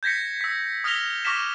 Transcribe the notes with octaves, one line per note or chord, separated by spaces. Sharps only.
G6 G#6 A#6 B6 C#7
E6 B6
D#6 F6 A#6 B6 F7 G7
C#6 D6 F6 A#6 B6 E7